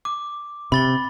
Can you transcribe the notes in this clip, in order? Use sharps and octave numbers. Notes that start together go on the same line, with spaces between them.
D6
C3 B5 A6 G7